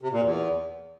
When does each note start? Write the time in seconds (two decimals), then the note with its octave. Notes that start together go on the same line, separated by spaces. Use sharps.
0.01 C3
0.12 A#2
0.23 E2